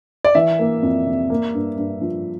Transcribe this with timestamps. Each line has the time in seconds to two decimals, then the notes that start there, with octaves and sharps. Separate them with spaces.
0.25 D5
0.35 E3 E5
0.59 A#3
0.82 F2
1.07 C3
1.30 A#3
1.54 G2
1.77 G2
2.01 F3